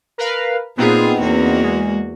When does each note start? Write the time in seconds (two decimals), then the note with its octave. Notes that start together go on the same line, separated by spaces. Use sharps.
0.18 A#4 B4 F5
0.77 A#2 B3 C4 D#4 F4 G#4
1.19 E2 A#3 F#4
1.63 G#3